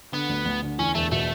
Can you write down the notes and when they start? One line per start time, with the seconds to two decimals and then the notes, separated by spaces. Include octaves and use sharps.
0.12 D3 B3
0.29 D2
0.45 D2
0.63 D3
0.78 E2 C#4
0.95 E1 A3
1.11 B2 A3